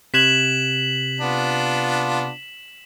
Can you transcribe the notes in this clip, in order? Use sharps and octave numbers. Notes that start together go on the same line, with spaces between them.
C3 F#6 G#6 B6 E7 F#7
B3 D4 F4